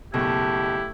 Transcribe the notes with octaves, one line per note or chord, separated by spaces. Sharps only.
F#1 B2 A3 E4 G4